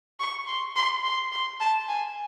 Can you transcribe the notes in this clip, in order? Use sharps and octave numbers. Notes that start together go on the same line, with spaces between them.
C#6
C6
C6
C6
C6
A5
G#5